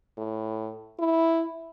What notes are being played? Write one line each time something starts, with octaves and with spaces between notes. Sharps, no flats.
A2
E4